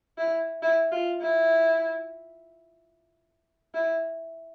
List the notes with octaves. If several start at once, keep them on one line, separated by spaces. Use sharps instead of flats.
E4
E4
F4
E4
E4